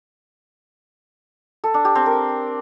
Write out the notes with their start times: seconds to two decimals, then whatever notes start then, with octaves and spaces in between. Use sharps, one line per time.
1.64 A4
1.74 D4
1.85 G4
1.95 C4
2.06 A#4